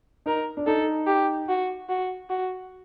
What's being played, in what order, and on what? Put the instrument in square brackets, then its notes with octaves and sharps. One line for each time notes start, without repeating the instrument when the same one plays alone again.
[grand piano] D#4 [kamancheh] A#4
[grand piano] D4
[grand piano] D#4 [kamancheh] A4
[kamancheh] G4
F#4
F#4
F#4